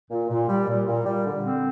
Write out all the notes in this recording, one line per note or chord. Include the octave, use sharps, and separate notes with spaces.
A#2
A#2
G3
A#2
A#2
G3
D3
C4